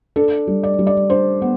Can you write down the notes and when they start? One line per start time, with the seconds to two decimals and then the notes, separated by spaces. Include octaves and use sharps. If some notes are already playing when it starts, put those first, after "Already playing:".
0.16 D4 A4
0.47 G3
0.63 D5
0.79 G3
0.87 D5
1.10 D4 C5
1.42 B3